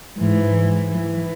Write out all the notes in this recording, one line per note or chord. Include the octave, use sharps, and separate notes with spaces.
G#2 E3
E3